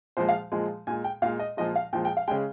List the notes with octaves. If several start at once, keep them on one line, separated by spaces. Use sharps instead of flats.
A#2 F3 G#3 C5
F5
A#2 F3 G#3
A#2 G#3 G#5
G5
A#2 G#3 F5
D#5
A#2 F3 G#3 D#5
F5
A#2 F3 G#3 G5
G5
F5
C#3 G#3 G5